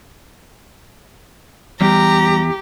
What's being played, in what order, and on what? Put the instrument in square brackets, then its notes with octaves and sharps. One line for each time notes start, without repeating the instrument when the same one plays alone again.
[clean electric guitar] E2 [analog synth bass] G3 [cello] G4 [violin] A#5